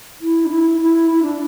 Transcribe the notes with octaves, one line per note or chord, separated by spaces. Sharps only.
E4
D4
E4
E4
E4
D4